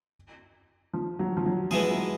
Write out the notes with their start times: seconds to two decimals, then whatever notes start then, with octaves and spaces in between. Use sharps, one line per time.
0.93 F3
1.19 F#3
1.37 F3
1.46 F#3
1.71 E3 F3 G#3 B3 E4 G#4
1.90 F#3